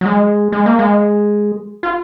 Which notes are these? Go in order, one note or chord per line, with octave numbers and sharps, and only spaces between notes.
F#3
G#3
G#3
A#3
G#3
F4